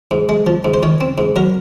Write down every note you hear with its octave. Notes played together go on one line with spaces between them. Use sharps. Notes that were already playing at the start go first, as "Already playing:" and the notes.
G#2
G#3
F3
G#2
C5
D#3 C#5
C4
G#2
F#3 A#4